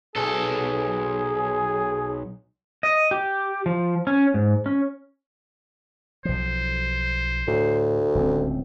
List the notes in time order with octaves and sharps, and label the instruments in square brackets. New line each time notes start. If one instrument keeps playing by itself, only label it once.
[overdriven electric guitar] B1 A4 [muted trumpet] G#4
[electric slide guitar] D#5
G4
F3
C#4
G#2
C#4
[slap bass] B1 F3 [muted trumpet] C5
[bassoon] D2 [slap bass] A2
[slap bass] D1 C#2 C4